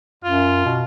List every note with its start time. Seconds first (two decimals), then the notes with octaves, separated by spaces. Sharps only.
0.24 F#2 F4
0.65 B2